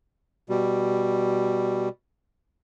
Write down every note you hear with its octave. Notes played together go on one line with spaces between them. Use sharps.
B2 G3